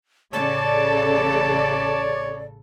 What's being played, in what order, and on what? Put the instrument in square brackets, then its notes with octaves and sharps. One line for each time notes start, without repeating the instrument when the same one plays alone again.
[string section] A1 C#3 A4 [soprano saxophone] C#5 [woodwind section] D5 [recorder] A5